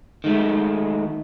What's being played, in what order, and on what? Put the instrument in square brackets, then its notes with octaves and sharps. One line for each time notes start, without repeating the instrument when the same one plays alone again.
[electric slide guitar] D#3 G#3 A3